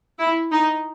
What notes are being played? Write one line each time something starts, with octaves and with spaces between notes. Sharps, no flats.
E4
D#4